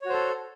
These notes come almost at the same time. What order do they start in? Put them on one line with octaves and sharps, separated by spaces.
C#5 F#4 C5 A4